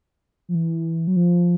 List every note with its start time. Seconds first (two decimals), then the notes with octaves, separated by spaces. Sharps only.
0.49 F3
0.55 E3
1.07 F#3
1.16 F3